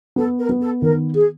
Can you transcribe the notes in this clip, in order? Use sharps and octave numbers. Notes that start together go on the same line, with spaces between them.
B3 A4
A#4
B3
A4
D#3 A#4
G#4